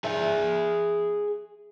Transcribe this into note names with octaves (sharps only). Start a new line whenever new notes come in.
G#4 E5